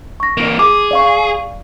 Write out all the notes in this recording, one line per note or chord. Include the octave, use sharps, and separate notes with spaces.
C#6 A#6
E3 A#3
G#4 D6
D5 F5 C#6